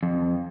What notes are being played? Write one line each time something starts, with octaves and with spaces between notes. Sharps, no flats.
F2